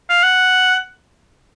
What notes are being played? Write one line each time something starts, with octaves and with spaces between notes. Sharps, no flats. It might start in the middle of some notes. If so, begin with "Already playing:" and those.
F5
F#5